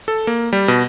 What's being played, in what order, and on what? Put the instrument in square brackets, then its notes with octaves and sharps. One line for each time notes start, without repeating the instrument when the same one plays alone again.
[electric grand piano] A4
A#3
G3
B2